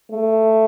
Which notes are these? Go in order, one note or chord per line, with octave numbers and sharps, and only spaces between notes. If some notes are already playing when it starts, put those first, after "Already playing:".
A3